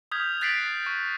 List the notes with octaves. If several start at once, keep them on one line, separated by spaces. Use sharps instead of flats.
D#6 F6 G6 G#6 B6 F7
F#6 A6 B6 C7 D7 F#7
C#6